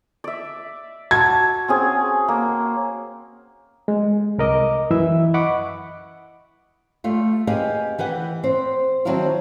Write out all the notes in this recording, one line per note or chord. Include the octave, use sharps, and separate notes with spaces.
D5 E5
F#4 A5 G#6
C4 C#4 G#4
A#3
G#3
C2 A#4 D#5 D6
F#2 E3 E4 E5 E6
D#5 F#5 B5 C#6 D6
G3 A3 F4
G4 G#4 B4 D#5 F5
E3 G4 B4 F#5
C4 C5
D#3 F#3 C4 D4 E4 F4